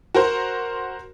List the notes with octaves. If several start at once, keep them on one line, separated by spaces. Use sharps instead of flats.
F#4 A#4 C5